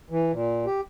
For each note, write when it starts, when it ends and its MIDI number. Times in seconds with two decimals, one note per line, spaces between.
0.10 0.32 52
0.32 0.66 46
0.66 0.81 67